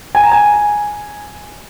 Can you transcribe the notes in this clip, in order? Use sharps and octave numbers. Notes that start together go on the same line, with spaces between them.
G#5
A#5
G#5